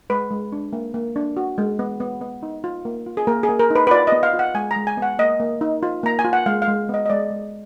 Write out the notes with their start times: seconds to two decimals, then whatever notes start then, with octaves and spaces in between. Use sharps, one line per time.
0.10 G#3 B4
0.31 G#3
0.52 D4
0.73 A#3
0.94 A#3
1.16 D4
1.37 F#4
1.58 G#3
1.79 B3
2.00 B3
2.21 B3
2.43 D#4
2.64 F4
2.85 A#3
3.06 F4
3.17 G#4
3.27 A#3 A#4
3.43 G#4
3.49 A#3
3.59 A#4
3.70 D#4
3.75 B4
3.87 B4
3.91 F4 D5
4.07 B3 D#5
4.23 F5
4.33 F4
4.39 F#5
4.54 G#3 G#5
4.71 A#5
4.76 G#3
4.87 G#5
4.97 B3
5.02 F#5
5.19 A#3 D#5
5.40 A#3
5.61 D#4
5.83 F4
6.03 A#3 A#5
6.19 G#5
6.24 F4
6.33 F#5
6.46 G#3 F5
6.62 F5
6.68 G#3
6.89 B3 D#5
7.05 D#5
7.10 G#3 D5
7.31 G#3